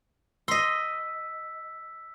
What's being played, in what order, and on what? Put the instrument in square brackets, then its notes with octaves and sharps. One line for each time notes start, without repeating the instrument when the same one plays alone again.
[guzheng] D#5 C6 [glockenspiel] E6 B6